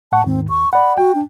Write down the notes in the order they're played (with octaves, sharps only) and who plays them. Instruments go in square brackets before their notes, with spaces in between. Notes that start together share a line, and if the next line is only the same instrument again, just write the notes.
[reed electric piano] A2 F#5 C#6 [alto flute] A5
[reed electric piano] D#2 G#2 D#3 [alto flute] C4
[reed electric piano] D#2 [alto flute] C#6
[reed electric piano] D5 F#5 [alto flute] B5
[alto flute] F#4 [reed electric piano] G5
[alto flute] D4